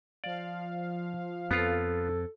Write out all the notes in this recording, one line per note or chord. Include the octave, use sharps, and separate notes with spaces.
F3 D5 F5
F2 B3 F4 A4